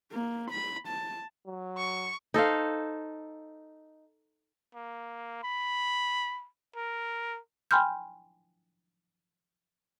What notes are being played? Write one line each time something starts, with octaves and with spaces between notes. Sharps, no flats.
A#3
B5
A5
F#3
C#6
D#4 A4 C5 F5
A#3
B5
A#4
G5 G#5 B5 C6 F6 G6